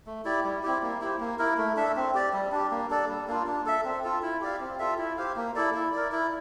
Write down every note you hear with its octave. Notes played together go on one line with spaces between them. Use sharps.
A3
E4 G4 D5
G3
C4 E4 G4
A#3
E4 G4 C5
A#3
E4 A#4
A3
D4 A4 E5
C4
G4 D5
G3
D4 G4
A#3
D4 A4 D5
G3
A#3 D4 F4
D4
A4 E5
C4
F4 A4
E4
G4 D5 F5
C4
F4 A4 E5
E4
G4 C5 F5
A#3
E4 A4 D5
E4
A#4 D5
E4